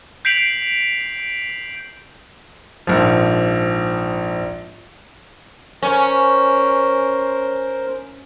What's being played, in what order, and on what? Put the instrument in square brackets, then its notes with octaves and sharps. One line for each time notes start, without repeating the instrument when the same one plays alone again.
[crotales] G6 B6 C7 D7 F7 F#7
[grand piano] A#1 G#2 F3
[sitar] C#4 [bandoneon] A#4 C5